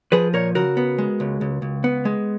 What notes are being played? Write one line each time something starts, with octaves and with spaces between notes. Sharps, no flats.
F3 G#4 B4
A#2 A#4 C#5
C#3 F#4 A#4
B3
G#3
C#2
C#2
C#2
B3
G#3